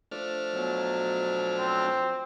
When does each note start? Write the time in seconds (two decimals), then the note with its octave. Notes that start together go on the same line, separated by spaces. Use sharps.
0.12 F3 A3 D4 F6
0.52 B2 F#3
1.58 C4